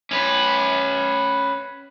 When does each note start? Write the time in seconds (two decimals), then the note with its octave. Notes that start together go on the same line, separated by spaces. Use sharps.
0.11 C#4 B4